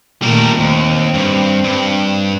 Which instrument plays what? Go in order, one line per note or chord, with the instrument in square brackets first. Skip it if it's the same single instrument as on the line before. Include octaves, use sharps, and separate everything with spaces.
[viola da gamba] A#2 D#3 A3 [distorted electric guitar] G3 A#4
[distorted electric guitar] D#2 [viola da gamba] C4
[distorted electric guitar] G2
G2